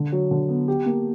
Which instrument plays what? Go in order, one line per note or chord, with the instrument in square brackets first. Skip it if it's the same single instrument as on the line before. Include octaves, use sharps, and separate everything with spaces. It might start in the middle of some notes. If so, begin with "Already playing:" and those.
Already playing: [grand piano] D3
F#3
D3
B3
G4
A#3